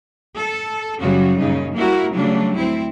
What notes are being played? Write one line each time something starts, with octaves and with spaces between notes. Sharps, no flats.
A4
F#2 C#3 F#3 G3 F#4
F#2 A#2 C#3 D#4
G3 A#3 E4 F#4 A#4
C#3 F#3 G3 A3 D4
D2 C4 E4